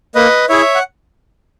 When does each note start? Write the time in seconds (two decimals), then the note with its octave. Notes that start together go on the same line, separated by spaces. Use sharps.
0.15 A#3 B4 D#5
0.49 E4 G#4 C#5 E5
0.75 F#5